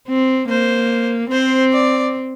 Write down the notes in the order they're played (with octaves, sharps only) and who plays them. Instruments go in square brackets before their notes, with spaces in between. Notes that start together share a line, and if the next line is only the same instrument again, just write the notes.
[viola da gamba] C4
[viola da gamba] A#3 [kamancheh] C5
[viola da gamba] C4 [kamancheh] C5
[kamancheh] D5